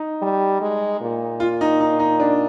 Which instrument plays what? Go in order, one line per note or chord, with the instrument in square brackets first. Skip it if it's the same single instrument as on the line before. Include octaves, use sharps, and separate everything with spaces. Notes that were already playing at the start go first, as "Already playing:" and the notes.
Already playing: [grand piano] D#4
[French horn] G3
G#3
A#2
[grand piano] F4
D#4
D#4
D#4
D4